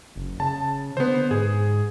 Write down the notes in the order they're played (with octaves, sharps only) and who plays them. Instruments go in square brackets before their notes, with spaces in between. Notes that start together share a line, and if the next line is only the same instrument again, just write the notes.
[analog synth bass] F#1
[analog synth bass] C#3 [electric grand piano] A5
[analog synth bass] D3 [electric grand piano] B3 C5
[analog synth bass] G#2 [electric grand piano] G#4